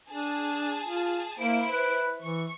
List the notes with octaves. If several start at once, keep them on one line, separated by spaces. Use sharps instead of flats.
D4 G#4 A5
F4
A#3 E4 C5 D7
B4
E3 C#6